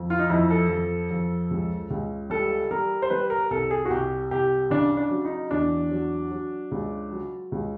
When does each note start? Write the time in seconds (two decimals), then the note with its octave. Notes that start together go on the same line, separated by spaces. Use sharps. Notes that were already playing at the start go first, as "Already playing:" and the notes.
Already playing: F2
0.10 F4
0.19 D#4
0.29 F2 E4
0.50 A4
0.69 F2
1.10 F2
1.51 C#2
1.90 C#2
2.30 G3 A4
2.71 G3 A#4
3.02 C5
3.10 G3 B4
3.30 A#4
3.50 C2 A4
3.71 G#4
3.85 F#4
3.90 C2 G4
4.31 C2 G4
4.70 C#3 D4
4.97 D4
5.10 F#3
5.25 D#4
5.50 E2 D4
5.91 F#3
6.31 F#3
6.71 C#2
7.12 F#3
7.52 C#2